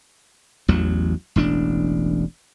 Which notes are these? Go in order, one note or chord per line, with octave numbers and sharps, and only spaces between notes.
A1 E2 F#3
E1 A1 D4